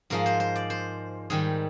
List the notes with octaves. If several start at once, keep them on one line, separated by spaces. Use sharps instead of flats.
G#2 F3 G#3 A#4
C5
C5
D5
C5
G#2 D#3 G3 G#4